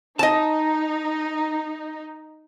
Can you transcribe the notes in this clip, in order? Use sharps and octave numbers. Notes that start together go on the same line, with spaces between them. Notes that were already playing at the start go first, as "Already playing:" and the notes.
D#4 D#5 A5